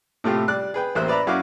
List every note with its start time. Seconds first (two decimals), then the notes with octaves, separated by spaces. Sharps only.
0.24 A2 C3 A3 F4 G4
0.48 G3 D5 F#6
0.74 G#4 B4 G5
0.95 A1 A#3 C5 E5 F#6
1.08 B4 D5 E5 A#5 B5
1.27 F#2 E4 F#4 F5 D6